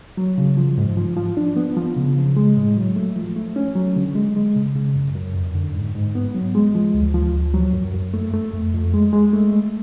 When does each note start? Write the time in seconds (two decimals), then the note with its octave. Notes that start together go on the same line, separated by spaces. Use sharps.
0.17 F#3
0.38 C#3
0.57 F3
0.78 G#2
0.97 F3
1.17 F3
1.37 D4
1.57 B3
1.77 F3
1.97 C#3
2.16 C#3
2.37 G#3
2.56 A2
2.77 F#3
2.96 A3
3.16 F3
3.36 A3
3.56 C#4
3.75 F#3
3.96 D3
4.15 G#3
4.36 G#3
4.56 C#3
4.75 C#3
4.96 F#2
5.15 F#2
5.35 F2
5.55 D3
5.75 G#2
5.95 G#2
6.15 B3
6.35 F#3
6.55 G#3
6.75 F3
6.95 D2
7.15 F3
7.34 D2
7.54 F#3
7.73 F#2
7.94 F#2
8.14 A3
8.34 A3
8.53 F2
8.74 F2
8.94 G#3
9.13 G#3
9.33 A3
9.53 A3